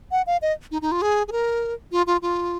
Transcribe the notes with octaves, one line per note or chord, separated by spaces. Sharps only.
F#5
F5
D#5
D#4
D#4
F4
G#4
G#4
A#4
F4
F4
F4